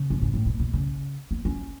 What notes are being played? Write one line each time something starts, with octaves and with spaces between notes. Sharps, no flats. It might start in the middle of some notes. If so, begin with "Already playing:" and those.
Already playing: C#3
F#2
G#2
A2
B2
B2
C#3
B3
C#4